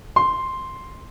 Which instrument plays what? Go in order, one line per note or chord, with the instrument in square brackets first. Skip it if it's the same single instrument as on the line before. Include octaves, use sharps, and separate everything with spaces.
[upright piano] C6